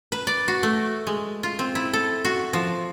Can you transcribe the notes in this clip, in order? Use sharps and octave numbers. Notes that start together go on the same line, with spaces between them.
B4
D5
F#4
A3
G#3
F4
C4
E4
A4
F#4
F3